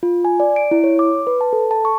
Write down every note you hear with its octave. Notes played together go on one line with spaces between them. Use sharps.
F4
G#5
D5
D7
E4
C#5
D6
B4
A5
A4
A5
C#6